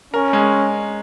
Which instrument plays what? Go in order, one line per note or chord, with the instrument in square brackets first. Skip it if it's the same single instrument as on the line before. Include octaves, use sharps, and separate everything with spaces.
[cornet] C#4 [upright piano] A#4
[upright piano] G#3